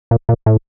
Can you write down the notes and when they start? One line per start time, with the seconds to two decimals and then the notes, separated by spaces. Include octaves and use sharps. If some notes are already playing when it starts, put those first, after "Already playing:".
0.11 A#2
0.29 A#2
0.46 A2